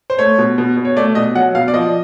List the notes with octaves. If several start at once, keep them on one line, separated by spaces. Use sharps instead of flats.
C5
A3 C#5
B2
B2
B2
C#5
A3 D5
B2 D#5
F#3 F#5
B2 F5
D5
F3 D#5